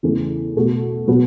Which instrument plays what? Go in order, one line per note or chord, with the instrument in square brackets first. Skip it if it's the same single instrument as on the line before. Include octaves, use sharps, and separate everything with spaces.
[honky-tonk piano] E2 C#3 E3 A3
B2 A3 F#4
B2 F#3 B3 F#4